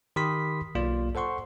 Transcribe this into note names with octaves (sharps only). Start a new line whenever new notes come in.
D#3 G4 B5 C6 D#6 B6
B1 A#3 F4 D5
A4 C5 F#5 C6 C#6